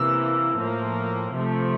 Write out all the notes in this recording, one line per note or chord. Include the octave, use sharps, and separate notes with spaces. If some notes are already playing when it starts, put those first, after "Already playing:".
Already playing: C3 E3 A#3 E6
A2 F3 A#3
C3 F3 A3